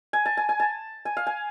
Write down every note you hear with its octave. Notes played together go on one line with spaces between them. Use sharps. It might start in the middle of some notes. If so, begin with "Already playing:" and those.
G#5
A5
G#5
G#5
A5
G#5
F5
G#5